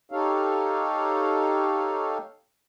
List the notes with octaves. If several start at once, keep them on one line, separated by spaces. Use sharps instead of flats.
D#4 G4 A4 C#5 F5